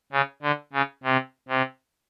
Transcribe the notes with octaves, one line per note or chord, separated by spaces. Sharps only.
C#3
D3
C#3
C3
C3